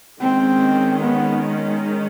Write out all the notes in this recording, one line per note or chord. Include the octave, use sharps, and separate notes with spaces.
D#3 G#3 C4 C#4
B3